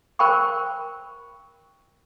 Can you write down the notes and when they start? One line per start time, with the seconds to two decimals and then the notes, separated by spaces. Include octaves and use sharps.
0.19 A#4 C5 G5 B5 C#6